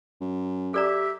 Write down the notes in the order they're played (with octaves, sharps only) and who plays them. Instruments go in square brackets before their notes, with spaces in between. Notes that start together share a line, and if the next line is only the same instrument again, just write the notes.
[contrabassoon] F#2
[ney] G4 [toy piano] A4 D5 A#5 [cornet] E5